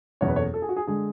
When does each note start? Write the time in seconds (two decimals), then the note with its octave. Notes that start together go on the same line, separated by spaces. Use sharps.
0.21 F#1 E2 B2 C#5
0.28 B4
0.36 A4 C#5
0.54 A4
0.62 G#4
0.69 F#4
0.77 G#4
0.87 D3 G#3 G#4